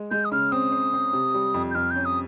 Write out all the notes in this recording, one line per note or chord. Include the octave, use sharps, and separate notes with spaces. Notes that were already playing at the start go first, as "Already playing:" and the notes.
Already playing: G#3
G#3 G6
D#6
C#3 F6
C4 D#6
C4
C4
C3
G3
F2
G6
F2 F6
G6
C#4
D#6